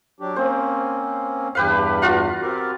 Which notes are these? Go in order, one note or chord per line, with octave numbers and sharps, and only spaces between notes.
F#3 D4 G4
A#3 C4 C#4 C5
E2 G2 G4 B4 F5
F4 F#4 F5
C4 G4 A#4